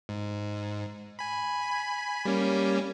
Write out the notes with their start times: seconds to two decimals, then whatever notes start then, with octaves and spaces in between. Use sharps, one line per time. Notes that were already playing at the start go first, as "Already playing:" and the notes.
0.09 G#2
1.19 G#5 B5
2.25 G3 A#3 C#4